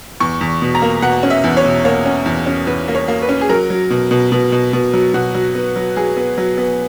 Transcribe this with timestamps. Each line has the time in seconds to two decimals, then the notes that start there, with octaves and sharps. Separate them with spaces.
0.20 E2 C#6
0.41 E2
0.62 B2
0.75 A#5
0.82 A#3
1.02 B2 F#5
1.23 C#4
1.30 E5
1.44 E2
1.57 C#5
1.64 B2
1.85 A#3 C#5
2.06 C#4
2.26 E2
2.46 C#4
2.67 E2 B4
2.88 A#3
2.95 C#5
3.08 A#3
3.22 B4
3.29 C#4
3.41 G#4
3.49 F#3 A#4
3.70 F#3
3.90 B2
4.11 B2
4.32 B2
4.52 B2
4.73 B2
4.93 F#3
5.14 B2 F#4
5.35 F#3
5.55 B3
5.76 F#3
5.96 F#3 G#4
6.17 B3
6.38 F#3
6.58 B3